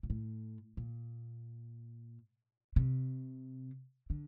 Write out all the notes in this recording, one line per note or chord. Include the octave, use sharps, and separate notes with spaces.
A#2
A2
A#2
C3
D3